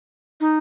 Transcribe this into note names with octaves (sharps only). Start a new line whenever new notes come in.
D#4